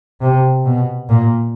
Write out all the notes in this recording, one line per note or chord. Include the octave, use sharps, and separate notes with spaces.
C3
B2
A#2